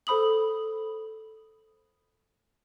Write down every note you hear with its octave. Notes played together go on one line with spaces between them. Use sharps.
A4 C5 B5 D#6 F#7